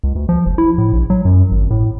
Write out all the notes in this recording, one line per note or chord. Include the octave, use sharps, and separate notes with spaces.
C#2
D2
F3
F1
E4
A2
A#1
F#3
F#2
G#1
A2